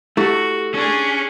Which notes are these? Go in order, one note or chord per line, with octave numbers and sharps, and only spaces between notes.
A3 E4 F#4 G4
C#4 D4 G#4